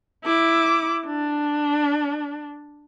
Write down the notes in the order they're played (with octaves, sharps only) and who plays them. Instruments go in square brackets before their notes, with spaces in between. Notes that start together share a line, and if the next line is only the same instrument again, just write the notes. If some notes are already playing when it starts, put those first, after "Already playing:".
[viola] E4 D6
D4